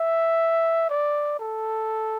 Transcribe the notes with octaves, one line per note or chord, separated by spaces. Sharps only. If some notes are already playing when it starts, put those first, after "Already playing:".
Already playing: E5
D5
A4